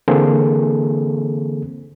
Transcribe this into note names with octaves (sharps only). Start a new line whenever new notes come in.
D3 E3 A#3 C4 G#4 A4